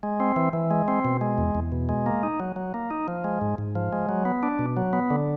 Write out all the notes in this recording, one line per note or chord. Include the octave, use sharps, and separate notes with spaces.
G#3
C4
E3
E3
G#3
C4
B2
G#3
E2
E2
B2
G#3
A#3
D#4
F#3
F#3
A#3
D#4
F3
G#3
G#2
G#2
F3
G#3
F#3
B3
D4
B2
F#3
B3
D3